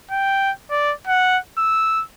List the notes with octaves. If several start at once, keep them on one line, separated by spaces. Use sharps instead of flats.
G5
D5
F#5
E6